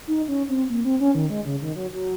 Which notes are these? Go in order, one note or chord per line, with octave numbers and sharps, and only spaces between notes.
D#4
C#4
C4
A#3
C4
C#4
D#3
G#3
C#3
D#3
F#3
F#3